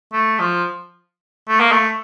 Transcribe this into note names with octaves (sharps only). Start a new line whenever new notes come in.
A3
F3
A3
A#3
A3